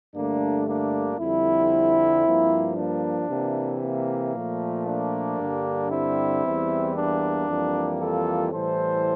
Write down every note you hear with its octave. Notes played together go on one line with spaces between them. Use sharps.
G2 D3 A3 A#3 D4
A#3 D4
F2 D3 G3 C4 E4
G2 F3 A#3
A#3 D4
C3 E3 A#3
A#3
A#2 F3 A3
A#3 D4
G2 D3 G3
C4 E4
E2 E3 G3
A#3 D4
F2 E3 G3 A#3
F4 A4
A2 E3 G3 A4 C5